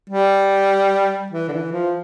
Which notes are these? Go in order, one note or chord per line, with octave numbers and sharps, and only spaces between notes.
G3
E3
D3
E3
F3